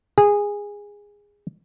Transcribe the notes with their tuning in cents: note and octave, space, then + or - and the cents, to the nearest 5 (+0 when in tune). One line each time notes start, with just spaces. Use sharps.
G#4 -15